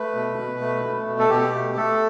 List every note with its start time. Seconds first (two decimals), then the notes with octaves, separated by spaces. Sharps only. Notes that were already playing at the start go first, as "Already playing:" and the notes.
Already playing: A3 B4
0.15 B2
0.38 B2
0.61 A3
0.85 A3
1.07 B2
1.19 A4
1.30 B2 G4
1.53 A3
1.76 A3 A4